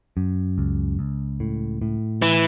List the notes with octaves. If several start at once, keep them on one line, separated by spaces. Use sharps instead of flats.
F#2
C#2
C#2
A2
A2
E3